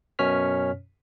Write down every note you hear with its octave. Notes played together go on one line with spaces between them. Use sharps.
F#2 B2 C#4 C#5 F6 B6